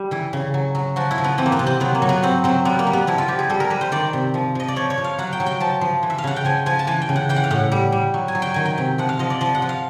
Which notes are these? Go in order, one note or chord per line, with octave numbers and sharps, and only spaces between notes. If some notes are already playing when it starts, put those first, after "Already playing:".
Already playing: G3
E3 E4
C#3
F#3
F#3
F3 F#4
E4
F3
B3
E3 C4
A#3
B3
C3
C4
F#3 B3
A#3
F#3
B3
F#3 C4
F#3 C4
G3 B3
A#3
G3
B3
F3 E4
F4
F3 G4
G#4
G3 A4
A#4
G3 B4
C5
D#3 D5
C3
F3
F3 D#5
D5
F3 C#5
C#5
F3
F5
F#3 F#5
G5
F#3
G5
F3 A5
F3
E3
E5
F5
C#3 F#5
G5
F3 G#5
F3 G#5
A5
E3 G#5
G5
C#3
F#5
E3 G5
F#5
F5
A2 F#5
G3
G3
F#3
G#5
F#3
G5
D#3 G#5
G5
C3
F3 F#5
F5
F3 D#5
D5
F3 D#5
F#5
F3
F5